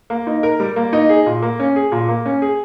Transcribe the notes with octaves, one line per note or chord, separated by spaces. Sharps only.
A#3
D#4
A#4
G3
A#3
D#4
G#4
A#2
A#3
C#4
G#4
A#2
A#3
C#4
G#4